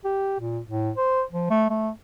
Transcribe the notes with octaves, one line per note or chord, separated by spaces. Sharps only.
G4
A#2
A2
C5
F3
A3
A3